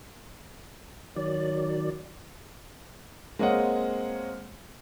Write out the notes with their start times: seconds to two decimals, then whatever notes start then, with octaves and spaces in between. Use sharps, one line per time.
1.16 D#3 F#3 C#5 D5
3.39 G#3 A#3 C4 C#5 D#5 F#5